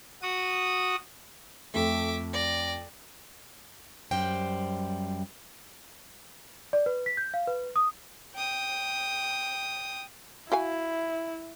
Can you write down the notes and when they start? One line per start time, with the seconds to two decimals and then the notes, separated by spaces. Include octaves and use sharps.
0.22 F#4 D#6
1.74 F2 A3 E5 D6
2.33 D5 A#6
4.11 F#2 G3 C5 G5
6.73 D5
6.86 B4
7.06 B6
7.17 G6
7.34 F5
7.48 B4
7.76 D#6
8.35 G5 D#6
10.52 E4 F#4 F5 G#5